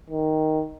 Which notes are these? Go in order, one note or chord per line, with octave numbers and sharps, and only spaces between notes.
D#3